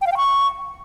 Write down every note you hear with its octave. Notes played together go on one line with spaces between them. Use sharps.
G5
F5
G5
C#6